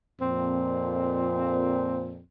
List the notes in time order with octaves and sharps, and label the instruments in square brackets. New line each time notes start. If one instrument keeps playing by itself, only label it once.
[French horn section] F2 A#2 [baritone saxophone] C4